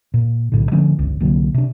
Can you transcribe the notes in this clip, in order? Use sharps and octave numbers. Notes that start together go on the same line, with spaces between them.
A#2
B1 A2 D3
D3 F3 A3 C#4
G1 C#2
C2 D3 F#3 A#3
C3 D4